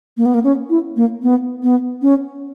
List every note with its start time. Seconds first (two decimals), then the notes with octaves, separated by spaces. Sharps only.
0.17 A#3
0.26 B3
0.34 A#3
0.44 C#4
0.70 E4
0.96 A#3
1.23 B3
1.63 B3
2.02 C#4